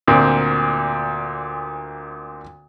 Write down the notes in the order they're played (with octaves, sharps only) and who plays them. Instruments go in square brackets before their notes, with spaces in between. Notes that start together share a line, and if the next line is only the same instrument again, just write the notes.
[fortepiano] D2 A#2 C4